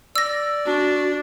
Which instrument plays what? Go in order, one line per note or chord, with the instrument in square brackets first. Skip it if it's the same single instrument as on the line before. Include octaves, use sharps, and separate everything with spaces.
[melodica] D5 [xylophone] E6 A#6
[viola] D4 [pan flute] F#4